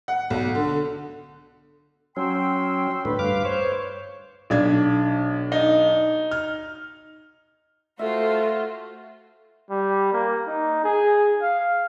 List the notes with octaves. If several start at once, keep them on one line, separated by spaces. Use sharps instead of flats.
F#5
B1
D3
F#3 C#4 G5 C6 E6
A2 D3 A3 B4
G2 F5 D6
C5 C#5
B1 D4 G#6
D#4
F6
A3 F4 F#4 C5 E5
G3
A#3
D#4
G#4
F5